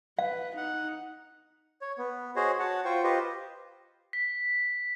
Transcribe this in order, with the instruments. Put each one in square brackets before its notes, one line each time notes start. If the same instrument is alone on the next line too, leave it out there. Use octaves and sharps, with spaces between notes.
[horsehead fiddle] B4 [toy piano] F5
[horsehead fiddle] D#4 [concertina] F#5
[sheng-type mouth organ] C#5
B3
F#4 G#4 C5 C#5 D#5
F#4 C#5 F#5 A5
F4 C5 G5 C#6
F4 G4 B4 C5 D#5
[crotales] B6